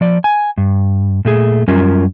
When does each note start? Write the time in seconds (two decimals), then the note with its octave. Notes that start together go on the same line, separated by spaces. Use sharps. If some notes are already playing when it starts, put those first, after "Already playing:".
0.01 F3 D5
0.24 G#5
0.58 G2
1.25 A#2 A3 G#4
1.68 F#2 G3 C#4 F4 A#4